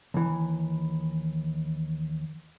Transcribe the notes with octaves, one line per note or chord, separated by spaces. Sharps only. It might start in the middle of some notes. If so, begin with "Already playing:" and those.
D#2 E3